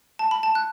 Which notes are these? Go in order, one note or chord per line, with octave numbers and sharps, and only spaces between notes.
A5
B5
A5
F#6